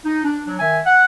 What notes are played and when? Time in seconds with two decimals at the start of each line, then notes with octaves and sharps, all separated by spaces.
0.06 D#4
0.24 D4
0.46 F#3 D4
0.60 D#3 E5 G#5
0.86 F#5